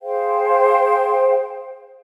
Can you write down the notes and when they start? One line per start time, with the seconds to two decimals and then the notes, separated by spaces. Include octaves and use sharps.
0.01 G#4 C5 F5 G5